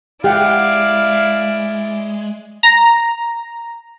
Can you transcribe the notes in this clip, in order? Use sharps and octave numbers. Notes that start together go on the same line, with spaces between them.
G#3 E4 G4 D5 F5 F#5
A#5